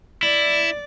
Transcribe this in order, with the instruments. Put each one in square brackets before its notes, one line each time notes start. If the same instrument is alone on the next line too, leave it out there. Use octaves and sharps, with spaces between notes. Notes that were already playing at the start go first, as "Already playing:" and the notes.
[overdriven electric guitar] E4 [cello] D5